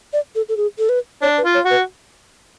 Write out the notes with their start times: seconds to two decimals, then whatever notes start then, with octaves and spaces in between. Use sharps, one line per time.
0.13 D5
0.35 A4
0.49 A4
0.57 G#4
0.78 A4
0.89 B4
1.22 D4 C#5
1.38 B4
1.44 F4
1.54 C#5
1.65 F#4
1.70 B4